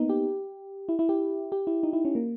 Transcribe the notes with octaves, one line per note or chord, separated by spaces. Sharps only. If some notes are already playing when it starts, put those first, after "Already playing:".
Already playing: A#3 B3 D#4
G4
E4
E4
G4
G4
E4
D#4
E4
C#4
A#3